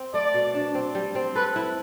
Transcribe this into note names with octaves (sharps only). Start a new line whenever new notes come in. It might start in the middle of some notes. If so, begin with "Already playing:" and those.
Already playing: C4
A3 D5
B2
D4
C4
G3
C4
A4 B4
E4